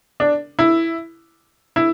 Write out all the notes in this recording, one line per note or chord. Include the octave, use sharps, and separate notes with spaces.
D4
E4
E4